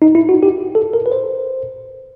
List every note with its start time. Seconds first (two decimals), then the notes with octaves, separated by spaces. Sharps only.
0.02 D#4
0.15 E4
0.29 F#4
0.43 G4
0.75 A4
0.93 A#4
1.06 B4
1.12 C5